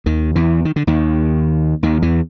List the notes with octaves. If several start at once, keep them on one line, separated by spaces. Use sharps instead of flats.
D#2 D#3
E2 E3
D#3
D3
D#2 D#3
D#2 D#3
E2 E3